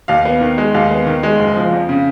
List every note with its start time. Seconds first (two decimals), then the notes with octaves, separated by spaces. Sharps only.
0.08 D#2 F5
0.25 B3
0.41 D#3
0.58 G#3
0.74 D#2 F5
0.91 B3
1.06 D#3
1.23 G#3
1.39 F#1
1.56 F3
1.73 F2
1.89 C#3